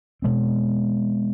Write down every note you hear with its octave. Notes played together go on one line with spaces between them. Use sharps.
B2 G#3 C4